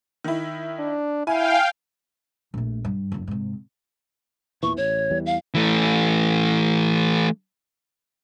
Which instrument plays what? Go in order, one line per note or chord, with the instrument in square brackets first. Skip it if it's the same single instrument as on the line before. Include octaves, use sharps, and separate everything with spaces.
[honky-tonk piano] D#3 E4
[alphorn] D4
[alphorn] E4 [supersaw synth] F5 G5 [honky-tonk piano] G#5
[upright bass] A#1 A3
G2
F#1 D#2
G#2 C3
[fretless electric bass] E2 A#2 E3 [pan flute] C#6
[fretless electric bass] A1 [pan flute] C#5
[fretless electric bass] E2 E3 G3
[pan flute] F5
[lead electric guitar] E3 A3